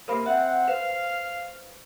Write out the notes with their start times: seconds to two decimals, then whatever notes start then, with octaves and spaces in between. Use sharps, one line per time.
0.08 C3 A#3 A#4 C5 B5
0.26 C4 E5 F#5
0.68 B4 C5 F5